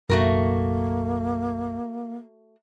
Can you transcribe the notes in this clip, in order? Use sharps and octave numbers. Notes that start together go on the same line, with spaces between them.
F#1 B1 F#2 A3 A#3 F#4 A#4